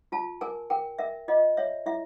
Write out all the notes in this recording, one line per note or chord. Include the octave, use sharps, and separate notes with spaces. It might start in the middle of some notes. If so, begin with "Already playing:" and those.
F4 A5
A#4 G#5
A#4 G5
A#4 E5
F4 D#5
C#5 E5
E4 E5